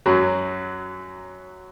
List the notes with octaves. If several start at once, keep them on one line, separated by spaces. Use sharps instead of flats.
F#2 F#3